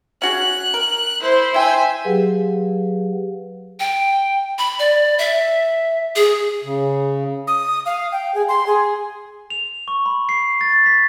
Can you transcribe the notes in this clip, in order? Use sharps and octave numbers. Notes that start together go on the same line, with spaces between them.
C#4 F#4 G#4 F#6
A#4
E4 C5
E4 E5 G5 G#5
F#3 G4 G#4 B4 F5 F#5
G5
B5
D5
E5
G#4
C#3
D#6
F5
G5
G#4
C6
G#4
F7
C#6
B5
C7
A6
B6